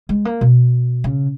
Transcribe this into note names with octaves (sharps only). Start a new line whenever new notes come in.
G#3
A#3
B2
C#3